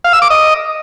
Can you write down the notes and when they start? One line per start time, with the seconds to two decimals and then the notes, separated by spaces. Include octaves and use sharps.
0.04 F5
0.13 E6
0.22 D6
0.30 D#5